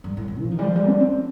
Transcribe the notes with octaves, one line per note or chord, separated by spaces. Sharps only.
G2
A2
A#2
F3
D#3
G3
F3
G3
D4
C4